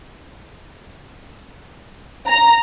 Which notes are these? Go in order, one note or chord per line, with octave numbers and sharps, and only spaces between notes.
A#5